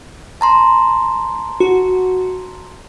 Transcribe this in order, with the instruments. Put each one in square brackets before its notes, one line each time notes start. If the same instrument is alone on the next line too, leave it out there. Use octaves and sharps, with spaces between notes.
[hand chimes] A5 A#5 C6
[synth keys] F#4